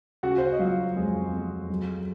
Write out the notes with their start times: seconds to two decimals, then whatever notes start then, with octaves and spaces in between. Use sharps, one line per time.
0.23 C#3 F#4 F#5
0.38 C5
0.45 C#5
0.53 D#5
0.59 F#3 F4 F5
0.96 F2 G#3 G#4
1.33 F2
1.70 F#3